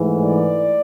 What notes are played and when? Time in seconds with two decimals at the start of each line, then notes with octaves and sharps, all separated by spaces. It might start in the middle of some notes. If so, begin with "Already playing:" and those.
Already playing: G#2 E3 A3
0.25 D5